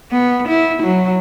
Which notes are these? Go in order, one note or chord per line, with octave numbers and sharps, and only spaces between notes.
B3
E4
F#3